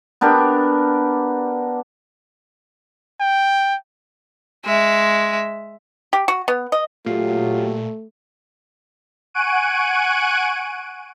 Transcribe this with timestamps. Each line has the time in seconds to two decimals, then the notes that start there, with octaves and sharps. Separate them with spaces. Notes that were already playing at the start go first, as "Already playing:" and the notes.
0.21 B3 D4 G4 A#4
3.20 G5
4.65 G#3 E5
6.13 G4
6.28 F#4
6.48 B3
6.72 D#5
7.06 A#2 F#3 A3 F4 G4
9.34 F#5 G#5 C#6 F#6 D7 D#7